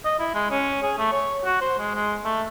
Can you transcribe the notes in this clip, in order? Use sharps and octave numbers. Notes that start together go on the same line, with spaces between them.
D#5
E4
G#3
C#4
G#4
A3
C#5
F#4
C5
G#3
G#3
A3